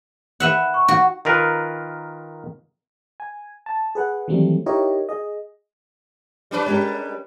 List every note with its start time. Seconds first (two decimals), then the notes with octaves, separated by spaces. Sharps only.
0.40 B4 E5 F#5 F#6
0.74 C#6
0.88 F#4
1.25 D#3 F4 A#4 B4
3.20 G#5
3.66 A5
3.95 G#4 B4 F#5
4.28 D#3 E3 F#3 G3 A3 C4
4.66 D#4 E4 G4 A#4 C#5 D#5
5.09 G#4 D#5
6.51 G3 C#4 B4
6.66 G#3 G4 A#4